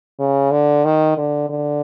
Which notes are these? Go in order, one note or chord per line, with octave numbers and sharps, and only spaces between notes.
C#3
D3
D#3
D3
D3